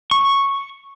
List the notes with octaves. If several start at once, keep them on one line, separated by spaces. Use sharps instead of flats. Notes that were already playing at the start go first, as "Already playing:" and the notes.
C#6